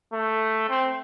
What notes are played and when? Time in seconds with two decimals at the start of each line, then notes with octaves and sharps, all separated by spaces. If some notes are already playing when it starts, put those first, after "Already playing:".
0.13 A3
0.69 C4